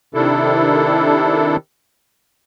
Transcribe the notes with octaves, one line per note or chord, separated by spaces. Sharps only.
C3 D#3 D4 E4 A4